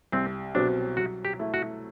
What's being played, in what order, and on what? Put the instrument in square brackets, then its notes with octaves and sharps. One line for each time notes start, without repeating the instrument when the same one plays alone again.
[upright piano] C2 [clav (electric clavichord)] C4
[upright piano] B2 F#3 C4 [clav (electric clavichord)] D4
[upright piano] F#3 [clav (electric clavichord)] F#4
[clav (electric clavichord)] G4
[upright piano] A3 E4
[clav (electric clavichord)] F#4